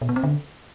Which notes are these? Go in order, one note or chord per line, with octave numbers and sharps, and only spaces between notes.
B2
B3
C4
D3